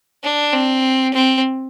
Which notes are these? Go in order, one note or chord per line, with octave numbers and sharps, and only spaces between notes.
D4
C4
C4